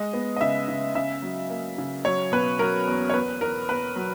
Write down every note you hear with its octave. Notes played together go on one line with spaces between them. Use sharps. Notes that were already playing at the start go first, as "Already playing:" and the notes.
Already playing: G#3 D#5
B3
D#5
C#3 E5
C#3
C#3 E5
F#3
A#3
C#3
F#3 C#5
B2 B4
F#3 A#4
E2
C#5
B3 B4
E2 A#4
E2 B4
F#3